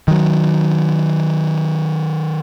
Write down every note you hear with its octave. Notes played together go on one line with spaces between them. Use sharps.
D#3 F#3